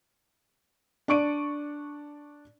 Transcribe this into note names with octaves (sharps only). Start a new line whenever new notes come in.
D4 D5 C#6 D7 D#7